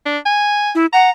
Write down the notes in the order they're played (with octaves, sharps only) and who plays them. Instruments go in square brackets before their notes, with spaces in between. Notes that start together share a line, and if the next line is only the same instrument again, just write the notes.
[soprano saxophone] D4
G#5
[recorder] E4
[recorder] F#5 [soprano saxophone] A#5